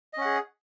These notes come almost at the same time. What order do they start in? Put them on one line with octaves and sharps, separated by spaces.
D#5 C#4 F#5 G#4